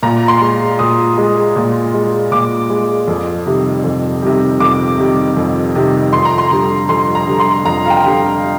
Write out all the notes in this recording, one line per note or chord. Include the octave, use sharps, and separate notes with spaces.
A#2 A#5
C6
G#3
A#2 D#6
G#3
A#2
G#3
A#2 D6
G#3
F2
C3 D#3 G3
F2
C3 D#3 G3
F2 D6
C3 D#3 G3
F2
C3 D#3 G3
F2 C6
A#5
C6
D3 G3
F2 C6
A#5
D3 G3
C6
F2 A#5
F5
G5
D3 G3